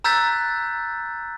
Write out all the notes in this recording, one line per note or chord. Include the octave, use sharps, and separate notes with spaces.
A#5 E6 F#6 G6 A6 B6